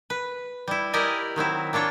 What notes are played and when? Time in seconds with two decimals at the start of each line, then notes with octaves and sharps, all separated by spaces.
0.10 B4
0.68 G3 E4
0.93 E4 G4 A#4 D5 D#5 G#5
1.36 D#3 F#3 C4 E4
1.73 A#3 D4 F4 C#5 G5